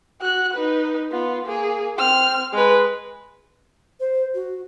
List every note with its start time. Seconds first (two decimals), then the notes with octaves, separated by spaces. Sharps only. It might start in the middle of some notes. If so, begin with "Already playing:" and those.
0.21 F#4 F#6
0.54 D#4 B4
1.12 B3 F4
1.45 A#3 G#4
1.97 C4 F6
2.53 G#3 B4
4.00 C5
4.34 F#4